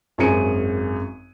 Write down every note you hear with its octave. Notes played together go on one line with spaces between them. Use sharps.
G#1 F#2 G#4 G#5 C#7 D#7